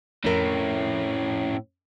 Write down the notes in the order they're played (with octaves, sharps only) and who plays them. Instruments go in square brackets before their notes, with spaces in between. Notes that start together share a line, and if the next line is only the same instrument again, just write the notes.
[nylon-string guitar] F2 A#4 [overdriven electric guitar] A2 [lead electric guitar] C#4 E4